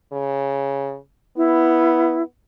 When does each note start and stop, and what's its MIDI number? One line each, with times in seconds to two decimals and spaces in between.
0.13 0.97 49
1.37 2.23 59
1.37 2.23 64